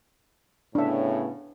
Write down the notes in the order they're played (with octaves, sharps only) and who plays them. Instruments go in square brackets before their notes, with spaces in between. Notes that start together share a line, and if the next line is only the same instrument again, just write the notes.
[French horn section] A2 C#3 B3 [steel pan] D4 E5